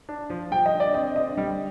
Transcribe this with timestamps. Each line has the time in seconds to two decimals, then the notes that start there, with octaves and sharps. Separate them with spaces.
0.09 D4
0.30 F3
0.51 G3 G5
0.66 D#5
0.73 D3
0.80 D5
0.94 C4 D#5
1.15 D3 D#5
1.37 G3